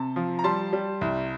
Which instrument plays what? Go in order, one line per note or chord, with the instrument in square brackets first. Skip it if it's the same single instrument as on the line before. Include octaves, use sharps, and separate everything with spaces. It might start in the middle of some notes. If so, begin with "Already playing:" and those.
Already playing: [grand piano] C3 A5
F3
A#5
G3 A5 C6
G3
C2